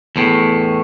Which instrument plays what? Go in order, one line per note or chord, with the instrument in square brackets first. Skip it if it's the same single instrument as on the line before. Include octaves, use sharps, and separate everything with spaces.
[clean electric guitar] E2 A2